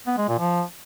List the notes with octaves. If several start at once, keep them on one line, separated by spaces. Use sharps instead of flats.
B3
G#3
A#2
F3